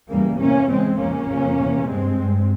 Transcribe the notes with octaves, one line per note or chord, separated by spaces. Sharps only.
E2 C#3 G3 A#3
E2 C3 A#3 C#4
E2 C#3 G#3 C4
F2 C#3 A#3 C#4
F2 C#3
E2 C3
G2 G#3 C4
G2